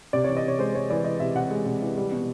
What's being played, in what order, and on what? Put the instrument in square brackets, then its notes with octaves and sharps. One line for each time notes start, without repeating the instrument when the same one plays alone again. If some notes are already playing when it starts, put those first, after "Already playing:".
[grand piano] C3 D5
E3 C#5
D#5
C3 C#5
G#3 C5
G#3 C#5
E3 D5
E3 D#5
C3 E5
C3 F#5
G#3
C3
E3
G3
B2